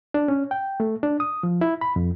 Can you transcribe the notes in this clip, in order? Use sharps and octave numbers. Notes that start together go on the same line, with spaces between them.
D4
C#4
G5
A3
D4
D#6
F3
E4
B5
F2